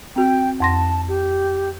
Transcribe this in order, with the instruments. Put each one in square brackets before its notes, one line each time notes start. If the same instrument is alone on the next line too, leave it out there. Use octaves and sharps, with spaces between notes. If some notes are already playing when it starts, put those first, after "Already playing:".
[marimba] C4 F#4 [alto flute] G5
[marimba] F2 C6 A#6 [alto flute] A5
[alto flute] G4